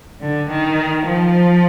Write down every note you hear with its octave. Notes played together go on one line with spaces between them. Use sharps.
D3
D#3
F3